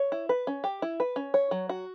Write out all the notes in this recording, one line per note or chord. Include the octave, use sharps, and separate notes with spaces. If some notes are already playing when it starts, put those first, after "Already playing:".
Already playing: C#5
E4
B4
C#4
G4
E4
B4
C#4
C#5
F#3
F#4